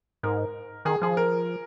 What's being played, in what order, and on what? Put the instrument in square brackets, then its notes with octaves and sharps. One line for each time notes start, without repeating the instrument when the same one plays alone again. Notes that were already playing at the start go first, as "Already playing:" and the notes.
[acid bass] G#2 [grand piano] A#4
[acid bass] D#3 [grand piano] G#4
[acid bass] F3 [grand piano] G#4
[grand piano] A#4